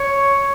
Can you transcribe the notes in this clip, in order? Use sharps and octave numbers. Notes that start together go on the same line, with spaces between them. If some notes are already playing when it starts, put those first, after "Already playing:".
Already playing: C#5